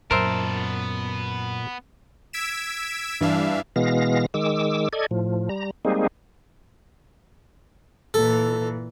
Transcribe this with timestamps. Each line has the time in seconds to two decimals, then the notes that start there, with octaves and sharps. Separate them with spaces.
0.11 F#2 A#2 B3 A#4 C5 E5 A5
2.33 E6 G#6 B6 D7 E7
3.21 G2 E3 D4 E5 F5
3.76 B2 E3 G#3 B3 F5 A#6
4.34 D#3 G#3 D6 E6
4.93 A4 D5 D#5 G#6
5.11 A2 F3
5.49 G3 A#5
5.85 G3 G#3 A#3 C4 D#4 G#4
8.14 A#2 E3 A4